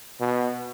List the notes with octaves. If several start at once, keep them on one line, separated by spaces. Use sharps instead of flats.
B2